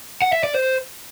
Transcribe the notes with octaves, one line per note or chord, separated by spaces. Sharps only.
F#5
E5
D5
C5